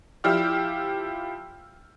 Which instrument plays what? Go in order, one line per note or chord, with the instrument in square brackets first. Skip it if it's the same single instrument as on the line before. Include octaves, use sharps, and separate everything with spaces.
[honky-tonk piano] F3 E4 G4 E6 F6